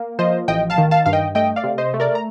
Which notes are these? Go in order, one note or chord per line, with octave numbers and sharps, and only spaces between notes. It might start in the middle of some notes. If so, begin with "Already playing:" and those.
Already playing: A#3
F3 C5 D#5
A1 D#5 G5
F5 A5
D#3
F5 A5
G2 F5
D#5 G5
A3 D#5 G5
D5 F5
C3
C5 D#5
A3
A#4 D5
A#5